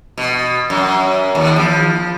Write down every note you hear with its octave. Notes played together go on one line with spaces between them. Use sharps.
B2
F#2
D#2
F3